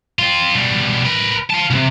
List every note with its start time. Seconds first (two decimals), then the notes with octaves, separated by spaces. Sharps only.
0.19 C4 F4
0.54 B2 G3
1.05 A#4 B4
1.50 F5 A5
1.71 C2 C3